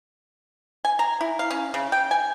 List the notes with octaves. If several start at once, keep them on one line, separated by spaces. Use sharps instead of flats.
G#5
A#5
E4
F5
C#4
C#3
G5
G#5